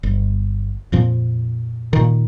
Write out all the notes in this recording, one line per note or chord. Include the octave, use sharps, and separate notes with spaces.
G1
F2 A#2 F3 C4
A#2 D#3